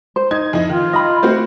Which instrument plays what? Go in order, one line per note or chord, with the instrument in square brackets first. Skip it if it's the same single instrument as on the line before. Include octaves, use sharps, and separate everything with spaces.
[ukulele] C5
[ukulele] D#4 [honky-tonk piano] G#6
[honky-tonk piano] F2 E4 D#5
[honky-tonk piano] D#3 [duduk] F4
[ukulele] D#5 B5
[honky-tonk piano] A3 C4 F#4 [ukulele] C5